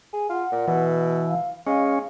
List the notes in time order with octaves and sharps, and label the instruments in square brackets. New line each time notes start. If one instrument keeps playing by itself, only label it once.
[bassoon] G#4
[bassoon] F4 [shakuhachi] F#5
[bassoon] A#2
[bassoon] B2 [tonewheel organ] E3
[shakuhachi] F5
[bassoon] G#3 [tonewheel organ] C#4 [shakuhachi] F5